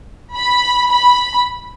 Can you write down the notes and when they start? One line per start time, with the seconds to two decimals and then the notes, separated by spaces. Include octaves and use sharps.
0.35 B5
0.88 B5